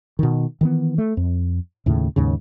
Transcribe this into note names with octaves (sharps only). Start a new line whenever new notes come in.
B2 D#3
D#3 E3 B3
A3
F2
D#2 A2 C#3
D#2 G#2 C#3